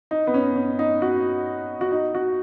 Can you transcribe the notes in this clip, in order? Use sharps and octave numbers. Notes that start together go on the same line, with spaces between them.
D#4
B3
C#4
C#4
D#4
F#4
F#4
D#4
F#4